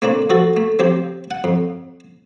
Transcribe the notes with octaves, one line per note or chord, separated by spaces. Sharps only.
A3 A#3 C4 D4
F3 F#4 A4
A3
F3 C4 G4
F#5
F2